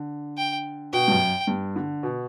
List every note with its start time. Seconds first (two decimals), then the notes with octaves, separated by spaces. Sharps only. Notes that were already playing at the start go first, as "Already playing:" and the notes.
Already playing: D3
0.38 G5
0.93 B2 G5
1.08 G2
1.12 F#2
1.47 G2
1.76 D3
2.03 B2